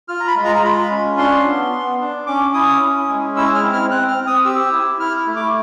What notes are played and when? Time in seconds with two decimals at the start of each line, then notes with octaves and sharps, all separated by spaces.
0.08 F4 F6
0.20 A#5
0.27 B5
0.36 G#3
0.45 A#5
0.55 A#5
0.63 F4 B5
0.91 C#4
1.18 D4 C6
1.46 B3
1.72 B3
2.00 D4
2.27 C#4 D6
2.54 E4 D#6
2.82 C#4
3.09 G#3
3.36 E4 E6
3.55 F6
3.63 C4
3.73 F6
3.91 C4 F#6
4.08 F6
4.18 C4
4.27 D#6
4.45 G4 E6
4.72 E4
5.00 E4 F6
5.27 A3
5.36 D6